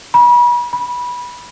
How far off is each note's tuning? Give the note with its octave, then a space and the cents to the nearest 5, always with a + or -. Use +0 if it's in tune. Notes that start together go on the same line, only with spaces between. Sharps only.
B5 -35
B5 -15